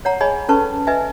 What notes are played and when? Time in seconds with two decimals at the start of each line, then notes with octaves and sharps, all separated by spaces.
0.05 C#5 F#5 A#5
0.21 G#4 C#5 D#5 G#5 B5
0.49 C#4 A4 B4 A5 C#6
0.87 B4 D#5 E5 G#5